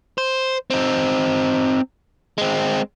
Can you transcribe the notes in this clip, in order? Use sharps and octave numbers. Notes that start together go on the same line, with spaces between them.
C5
C4 D#4
G#3 C4